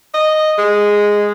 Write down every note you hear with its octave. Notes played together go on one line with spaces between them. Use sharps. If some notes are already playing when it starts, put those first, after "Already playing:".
D#5
G#3